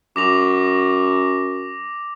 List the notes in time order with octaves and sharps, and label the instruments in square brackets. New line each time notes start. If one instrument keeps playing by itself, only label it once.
[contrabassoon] F#2 [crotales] D6 A#6 F7